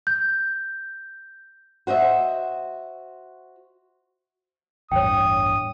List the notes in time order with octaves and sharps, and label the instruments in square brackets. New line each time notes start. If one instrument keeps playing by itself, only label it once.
[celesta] G6
[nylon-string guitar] F#4 C5 D#5 E5
[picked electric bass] A1 E2 G2 [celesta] C#5 G5 [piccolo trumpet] D#6